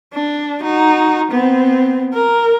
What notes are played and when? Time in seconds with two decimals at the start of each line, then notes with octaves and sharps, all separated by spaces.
0.13 D4
0.62 D#4 F#4
1.31 B3 C4
2.13 A#4